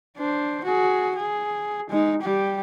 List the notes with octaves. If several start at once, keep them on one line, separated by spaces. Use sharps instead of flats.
D4 C5
F#4 G#4
G#4
G#3 D#4
G3 G4